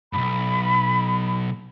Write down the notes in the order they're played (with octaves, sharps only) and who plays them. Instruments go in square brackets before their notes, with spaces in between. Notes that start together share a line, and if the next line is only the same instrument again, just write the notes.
[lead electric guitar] B1 G2 [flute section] B5